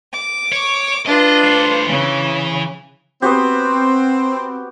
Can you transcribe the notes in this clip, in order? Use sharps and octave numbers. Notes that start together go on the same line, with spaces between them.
D6
C#5
D4 F4 B4 D#5
A2 C5
C#3 E3
B3 C4 F#4 G4